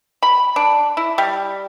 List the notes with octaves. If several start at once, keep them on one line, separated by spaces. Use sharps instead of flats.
B5
D4
E4
G3